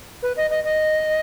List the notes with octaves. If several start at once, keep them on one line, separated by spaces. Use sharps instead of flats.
B4
D#5
D#5
D#5